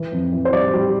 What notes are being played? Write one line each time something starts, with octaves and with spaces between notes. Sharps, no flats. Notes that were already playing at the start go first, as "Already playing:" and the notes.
Already playing: E3
F2
E3
C5
G3 D5
G3